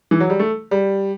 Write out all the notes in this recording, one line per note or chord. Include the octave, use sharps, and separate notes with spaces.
E3
F#3
G3
A3
G3